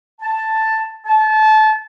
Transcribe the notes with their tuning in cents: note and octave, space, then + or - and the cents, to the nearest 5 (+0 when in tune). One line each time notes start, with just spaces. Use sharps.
A5 +5
A5 -25